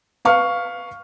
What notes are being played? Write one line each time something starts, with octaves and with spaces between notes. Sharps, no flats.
B4 F5 C#6 F6